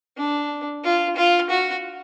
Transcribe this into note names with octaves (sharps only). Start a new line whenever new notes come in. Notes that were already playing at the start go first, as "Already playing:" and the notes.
D4
F4
F4
F#4